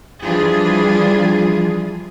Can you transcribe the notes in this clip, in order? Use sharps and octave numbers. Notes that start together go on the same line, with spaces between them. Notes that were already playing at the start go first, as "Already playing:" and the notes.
E3 F3 G3 D4 F4 G#4